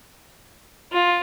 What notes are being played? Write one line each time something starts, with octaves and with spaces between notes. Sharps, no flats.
F4